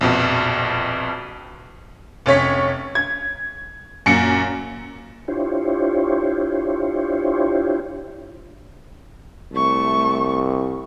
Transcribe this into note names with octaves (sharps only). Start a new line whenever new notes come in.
A#1 F2 B2
F1 C#4 C#5 B6
G#6
F#2 A#2 C#7
D4 E4 F4 G4 C5 C#5
C2 A3 C#6